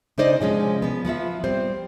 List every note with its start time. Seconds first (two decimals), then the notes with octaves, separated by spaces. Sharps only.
0.18 C#3 D4 D#4 C5 D5 D#5
0.41 C3 F3 G#3 C#4
0.82 F3 B3
1.05 F3 B3 F4 E5
1.44 G3 C4 C5